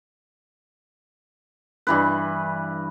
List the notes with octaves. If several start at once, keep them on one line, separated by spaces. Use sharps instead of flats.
G2 E3 B4